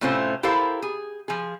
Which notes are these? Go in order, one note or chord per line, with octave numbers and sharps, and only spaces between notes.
A2 C3 A3 C#4 F4 C5
E4 G4 A4 A#4 C5 F5
G#4
F3 G#4